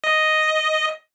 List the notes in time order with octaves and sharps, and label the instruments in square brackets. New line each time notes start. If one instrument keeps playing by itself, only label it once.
[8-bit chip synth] D#5